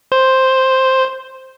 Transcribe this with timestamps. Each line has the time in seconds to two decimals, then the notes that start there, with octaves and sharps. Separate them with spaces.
0.12 C5